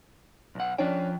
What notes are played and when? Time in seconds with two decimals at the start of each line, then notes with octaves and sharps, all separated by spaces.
0.55 B1 F#5
0.78 F3 C#4 D4 G5